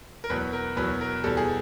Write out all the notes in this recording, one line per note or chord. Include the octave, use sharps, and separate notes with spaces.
A#4
E2 B2 F#3 B4
A#4
E2 B2 F#3 B4
A#4
E2 B2 G3 A4
G#4